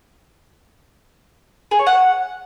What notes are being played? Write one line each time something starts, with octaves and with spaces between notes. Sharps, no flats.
G#4
C#5
F#5